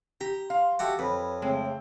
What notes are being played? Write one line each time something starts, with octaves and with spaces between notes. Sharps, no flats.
G4 A#5
F5 C6
F#4 G4 A4 E5
F2 B4 C#5
C#3 G#3 A3 C4